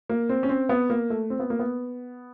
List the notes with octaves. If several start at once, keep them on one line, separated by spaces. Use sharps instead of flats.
A#3
C4
C#4
C4
B3
A#3
A3
C4
B3
A#3
B3